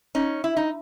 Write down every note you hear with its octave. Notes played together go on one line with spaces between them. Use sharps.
C#4 D#4
E4
D#4